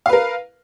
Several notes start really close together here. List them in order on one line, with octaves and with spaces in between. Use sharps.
F5 B4 A#4